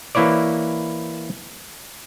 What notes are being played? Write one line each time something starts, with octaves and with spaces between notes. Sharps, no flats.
E3 A#3 E4 C#5 D5